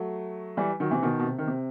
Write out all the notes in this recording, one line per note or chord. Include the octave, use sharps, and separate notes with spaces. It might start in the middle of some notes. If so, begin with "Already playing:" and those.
Already playing: F#3 A3
E3 G3
D#3 F#3
C3 E3
B2 D#3
B2
C3
D#3
C3